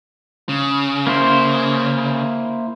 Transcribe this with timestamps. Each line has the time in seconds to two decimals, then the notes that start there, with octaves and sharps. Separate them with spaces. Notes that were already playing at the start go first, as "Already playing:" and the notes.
0.49 C#3
1.07 A#3 E4 C5